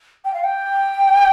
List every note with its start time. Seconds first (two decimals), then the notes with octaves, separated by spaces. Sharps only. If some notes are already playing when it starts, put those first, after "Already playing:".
0.25 G5
0.34 F5
0.44 G5